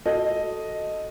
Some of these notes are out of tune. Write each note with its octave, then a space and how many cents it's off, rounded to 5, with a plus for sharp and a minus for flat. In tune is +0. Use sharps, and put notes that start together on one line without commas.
F#4 +0 A4 +0 D#5 +0